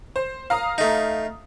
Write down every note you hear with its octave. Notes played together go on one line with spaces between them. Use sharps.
C5
F5 A#5 D#6
A3 D#4